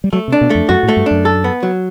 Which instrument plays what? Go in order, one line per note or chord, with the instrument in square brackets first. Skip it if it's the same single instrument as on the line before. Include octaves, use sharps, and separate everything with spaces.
[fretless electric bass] G3
[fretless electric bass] F#3 [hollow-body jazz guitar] A3
[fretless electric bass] C3
[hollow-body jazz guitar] D4
[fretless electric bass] B2
[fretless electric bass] F2 [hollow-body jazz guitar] A3
[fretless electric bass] F#2 [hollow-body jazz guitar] F#4
[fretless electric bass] A2
[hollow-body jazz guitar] A3
[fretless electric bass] G2
[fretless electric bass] F#2 [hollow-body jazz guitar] D4
[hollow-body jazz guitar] A4
B3
F#3